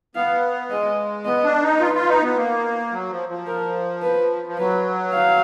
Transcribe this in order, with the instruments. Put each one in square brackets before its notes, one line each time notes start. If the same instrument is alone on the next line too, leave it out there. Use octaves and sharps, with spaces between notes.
[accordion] B3 [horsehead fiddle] F5
[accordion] G#3 [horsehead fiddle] D#5
[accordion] B3 [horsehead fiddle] D#5
[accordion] D4
D#4
[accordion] F4 [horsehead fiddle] B4
[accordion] F4
D#4
B3
A#3
F#3
F3
F3
[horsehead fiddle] A#4
B4
[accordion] F3
[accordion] F#3 [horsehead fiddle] B4
[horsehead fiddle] F5